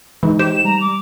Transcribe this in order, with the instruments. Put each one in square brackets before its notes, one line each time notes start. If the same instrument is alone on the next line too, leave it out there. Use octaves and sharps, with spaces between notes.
[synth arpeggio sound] E3 [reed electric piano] G#3 D#4
[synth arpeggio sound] G4 C5 [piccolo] E7
[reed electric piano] G3 [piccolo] A#5
[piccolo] D6